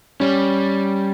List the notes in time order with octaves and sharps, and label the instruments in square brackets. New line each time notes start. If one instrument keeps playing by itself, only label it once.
[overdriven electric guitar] G3 [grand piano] C#4